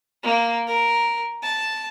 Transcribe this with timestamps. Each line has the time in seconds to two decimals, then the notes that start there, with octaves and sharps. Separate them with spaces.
0.23 A#3
0.67 A#4
1.43 A5